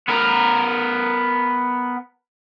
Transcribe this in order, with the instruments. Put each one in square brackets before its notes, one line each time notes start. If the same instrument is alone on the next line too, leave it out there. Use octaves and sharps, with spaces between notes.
[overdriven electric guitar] B3 A#4